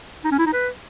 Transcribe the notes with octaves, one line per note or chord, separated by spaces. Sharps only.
D#4
C#4
E4
D#4
B4